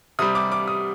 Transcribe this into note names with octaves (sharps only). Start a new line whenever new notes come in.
C3 G3 D#6
D6
D6
D#6